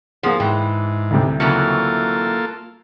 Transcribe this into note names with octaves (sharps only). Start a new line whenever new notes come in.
F3 A#3 G#4 F#5
G#2 E3 G5
D2 C3 G3
C#3 E3 F#3 A#3 F4 A4